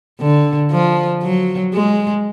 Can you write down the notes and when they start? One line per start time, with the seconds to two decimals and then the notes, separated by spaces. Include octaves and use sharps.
0.20 D3
0.71 F3
1.23 F#3
1.74 G#3